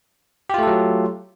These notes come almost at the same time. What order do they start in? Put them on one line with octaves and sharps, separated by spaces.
G4 F4 A3 A4 F#3